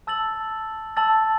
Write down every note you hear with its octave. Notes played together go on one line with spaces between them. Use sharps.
A5 E6 A6 F#7
A5 E6 A6 F#7